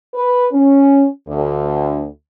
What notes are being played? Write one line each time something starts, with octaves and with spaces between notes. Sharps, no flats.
B4
C#4
D2